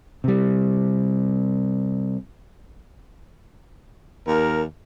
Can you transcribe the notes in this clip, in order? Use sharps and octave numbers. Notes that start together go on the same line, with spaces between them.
C3 G3
D#2 A#4